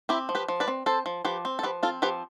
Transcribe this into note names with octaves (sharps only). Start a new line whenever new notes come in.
C4 E4 G4
F3
G4 B4
F3
B4 D5
C4
C4 A4 C5
F3
F3 G4 B4
C4
A4
F3 G4 B4
C4 F4 A4
F3 G4 B4